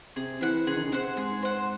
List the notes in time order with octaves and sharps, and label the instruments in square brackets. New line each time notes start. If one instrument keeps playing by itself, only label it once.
[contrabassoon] C3 [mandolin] G#4
[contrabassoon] E3 [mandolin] C5 F#5
[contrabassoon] C#3 [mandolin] G#4
[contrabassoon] D#3
C#3
[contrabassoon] C3 [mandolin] C5 F#5
[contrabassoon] G#2 [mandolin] G#4
[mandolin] C5 F#5